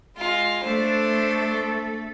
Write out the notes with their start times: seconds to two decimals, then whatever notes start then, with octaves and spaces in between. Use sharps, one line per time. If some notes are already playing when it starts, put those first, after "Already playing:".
0.17 G#3 F4
0.64 A3 D4 A4 C5